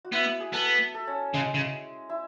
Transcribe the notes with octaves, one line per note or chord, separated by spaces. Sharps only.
F#4
B3 E4
G#4
B3 A4
A4
C#4
C#3 G#3
C#3
E4